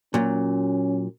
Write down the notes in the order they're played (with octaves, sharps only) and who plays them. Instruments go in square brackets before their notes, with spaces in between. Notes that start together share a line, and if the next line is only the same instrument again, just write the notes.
[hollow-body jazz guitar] A#2 F#3 [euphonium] C#4